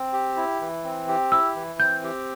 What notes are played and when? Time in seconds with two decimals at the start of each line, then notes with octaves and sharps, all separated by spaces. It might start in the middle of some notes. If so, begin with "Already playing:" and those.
Already playing: C4
0.13 G4
0.36 E4
0.61 E3
0.84 C4
1.08 G4
1.32 E4 E6
1.56 E3
1.80 C4 G6
2.03 G4